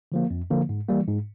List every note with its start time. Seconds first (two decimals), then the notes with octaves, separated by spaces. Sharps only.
0.12 D3 F3 A#3
0.30 F2
0.51 D3 F3 A#3
0.69 G#2
0.88 E3 G3 A#3
1.07 G#2